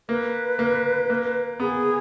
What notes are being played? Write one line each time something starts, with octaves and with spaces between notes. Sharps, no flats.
A#3 B4
A#3
A#3
B3 G#4